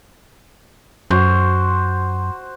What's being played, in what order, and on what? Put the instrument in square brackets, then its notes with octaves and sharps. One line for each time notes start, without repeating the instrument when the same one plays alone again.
[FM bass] F#2 [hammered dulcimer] F#4 C5